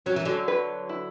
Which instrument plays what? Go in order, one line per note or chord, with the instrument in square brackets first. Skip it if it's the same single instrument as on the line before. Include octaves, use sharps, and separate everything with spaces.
[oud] F#3 [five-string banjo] C#4
[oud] E3
D3 F#3
[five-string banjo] B4
E4